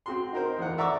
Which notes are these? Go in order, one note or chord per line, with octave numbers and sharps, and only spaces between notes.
C4 F#4 C6
D#4 A#4 C5
E2 F#5
D5 E5 A#5 C#6 D6 E6